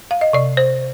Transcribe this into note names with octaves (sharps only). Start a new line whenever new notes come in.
F5
D#5
C3 D5
C5